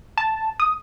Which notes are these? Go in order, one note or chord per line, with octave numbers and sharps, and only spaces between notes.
A5
D#6